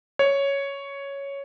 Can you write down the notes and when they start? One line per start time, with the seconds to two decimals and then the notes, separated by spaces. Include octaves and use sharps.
0.19 C#5